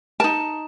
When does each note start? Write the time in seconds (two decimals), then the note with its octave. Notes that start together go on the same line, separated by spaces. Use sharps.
0.20 D#4 A#4 A5